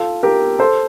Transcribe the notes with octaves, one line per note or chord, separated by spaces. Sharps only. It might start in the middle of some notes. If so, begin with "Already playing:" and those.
Already playing: F4 A4
G4 A#4
A4 C5